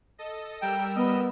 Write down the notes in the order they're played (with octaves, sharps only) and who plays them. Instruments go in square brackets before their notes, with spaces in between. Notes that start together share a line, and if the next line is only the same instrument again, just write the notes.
[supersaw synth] A4 D#5
[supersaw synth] G3 A#4 E6 [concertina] G5
[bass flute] B3 [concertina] D#5